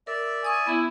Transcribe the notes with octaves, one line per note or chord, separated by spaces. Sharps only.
A#4 D5 E5
G#5 C#6 D#6
B3 E4